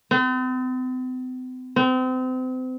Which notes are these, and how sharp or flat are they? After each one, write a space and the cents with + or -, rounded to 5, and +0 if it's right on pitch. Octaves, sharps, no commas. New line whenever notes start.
C4 -45
C4 -35